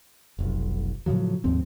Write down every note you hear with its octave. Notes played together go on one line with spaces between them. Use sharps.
F1 B1
A2 C#3 F3 F#3
D#2 G#2 F3 C4